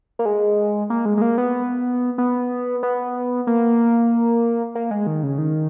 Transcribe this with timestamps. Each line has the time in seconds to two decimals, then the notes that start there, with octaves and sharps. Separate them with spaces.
0.19 A#3
0.26 G#3
0.90 A#3
1.05 G#3
1.17 G#3
1.22 A#3
1.38 B3
2.18 B3
2.83 B3
3.47 A#3
4.75 A#3
4.91 G#3
5.07 D#3
5.23 C#3
5.38 D#3